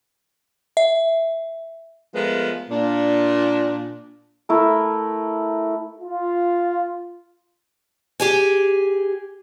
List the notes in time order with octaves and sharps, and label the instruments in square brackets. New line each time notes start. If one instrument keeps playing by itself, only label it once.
[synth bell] E5
[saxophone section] F3 G#3 A3 B3 A#4 B4
A#2 D4
[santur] A3 E4 A#4
[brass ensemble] F4
[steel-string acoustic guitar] G4 G#4 G#5